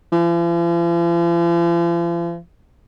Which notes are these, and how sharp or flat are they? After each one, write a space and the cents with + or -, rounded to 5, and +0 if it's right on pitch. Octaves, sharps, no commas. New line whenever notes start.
F3 -45